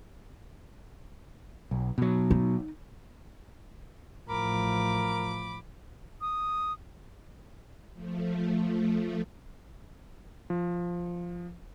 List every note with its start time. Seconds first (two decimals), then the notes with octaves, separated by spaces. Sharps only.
1.71 B1
1.98 B2 F#3
2.31 D#4
4.29 A1 F3 A#4 B5 D6
6.21 D#6
7.93 F3 A3
10.50 F3